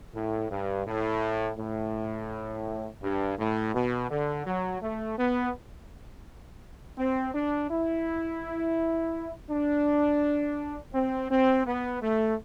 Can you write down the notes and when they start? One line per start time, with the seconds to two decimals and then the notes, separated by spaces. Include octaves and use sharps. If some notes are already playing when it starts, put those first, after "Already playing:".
0.14 A2
0.51 G2
0.87 A2
1.58 A2
3.02 G2
3.39 A2
3.74 B2
4.10 D3
4.46 F#3
4.82 A3
5.18 B3
6.98 C4
7.34 D4
7.70 E4
9.50 D4
10.94 C4
11.30 C4
11.66 B3
12.02 A3